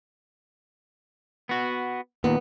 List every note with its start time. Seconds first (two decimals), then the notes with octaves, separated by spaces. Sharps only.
1.49 B3 F#4
2.24 D#2 A#2 B3